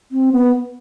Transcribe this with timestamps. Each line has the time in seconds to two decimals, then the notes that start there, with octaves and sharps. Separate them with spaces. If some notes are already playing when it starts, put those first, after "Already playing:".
0.12 C4
0.32 B3